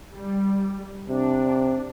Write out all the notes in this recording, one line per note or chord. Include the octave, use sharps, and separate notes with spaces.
G3
C3 D4